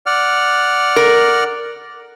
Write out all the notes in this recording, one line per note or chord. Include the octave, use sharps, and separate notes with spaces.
D5 F#5 F6
A#4